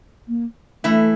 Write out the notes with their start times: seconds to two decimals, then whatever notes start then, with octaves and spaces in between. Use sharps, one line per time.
0.28 A#3
0.84 E3 A3 E4